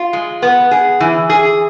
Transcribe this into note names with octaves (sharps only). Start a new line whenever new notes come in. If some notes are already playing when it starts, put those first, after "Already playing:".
Already playing: F4
G#3
B3
G#4
E3
G#4